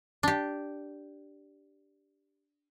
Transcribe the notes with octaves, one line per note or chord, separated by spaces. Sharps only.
D4 G4